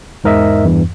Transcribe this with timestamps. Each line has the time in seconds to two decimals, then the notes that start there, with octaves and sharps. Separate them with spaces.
0.24 E2 G#2 A#4 D#5 E5
0.65 E2 G2 E3